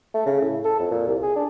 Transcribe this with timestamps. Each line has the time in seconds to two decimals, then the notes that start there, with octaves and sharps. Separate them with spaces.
0.14 A3
0.26 C#3
0.41 A2
0.65 A4
0.79 F2
0.91 A#2
1.07 C2
1.23 G#4
1.36 D4